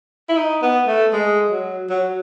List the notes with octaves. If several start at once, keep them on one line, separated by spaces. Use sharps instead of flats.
E4
D#4
B3
A3
G#3
F#3
F#3